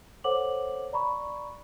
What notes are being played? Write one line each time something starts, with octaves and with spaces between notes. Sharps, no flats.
A4 C5 C#5 F#5 D6 F#7
D5 A#5 B5 C#6